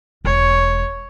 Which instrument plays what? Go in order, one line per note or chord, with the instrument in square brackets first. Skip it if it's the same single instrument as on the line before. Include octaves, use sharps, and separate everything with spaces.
[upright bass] E1 [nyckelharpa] C#5